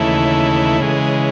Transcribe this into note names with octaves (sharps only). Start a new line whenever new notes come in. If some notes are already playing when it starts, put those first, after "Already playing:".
Already playing: D#2 C#3 E3 A3 E4
C#3 E3 G#3